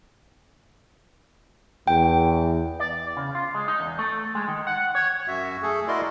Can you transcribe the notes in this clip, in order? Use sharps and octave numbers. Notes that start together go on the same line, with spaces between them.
E2 G5
D5
C#3
F4
G#3
D#4
E2
A3
G#3
D#3
F#5
C#5
F#2 F#4 E5
A3 G#4 A4
E4 F#4 A#4 D5 D#5 C6